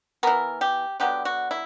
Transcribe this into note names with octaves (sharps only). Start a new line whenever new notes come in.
E3 B3 A#4
G4
D3 F#3 B3 G4
F#4
E4